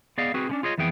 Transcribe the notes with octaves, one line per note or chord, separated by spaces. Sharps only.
B3 G#4 D5 D#5 F5
C4 F#4 G#4 B4
D3 C#4 D4
F4 G#4 C#5 D#5
F2 E3 B3 G#4 G5